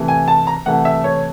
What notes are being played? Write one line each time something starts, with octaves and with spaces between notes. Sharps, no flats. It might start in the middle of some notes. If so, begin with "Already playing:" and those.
Already playing: C3 E3 A3
G#5
A5
A#5
C3 E3 A3 F#5
E5
C#5